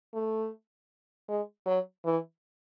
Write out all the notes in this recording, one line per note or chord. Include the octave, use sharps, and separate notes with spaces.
A3
G#3
F#3
E3